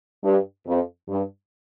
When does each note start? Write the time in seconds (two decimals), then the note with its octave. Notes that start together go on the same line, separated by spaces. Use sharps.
0.24 G2
0.66 F2
1.08 G2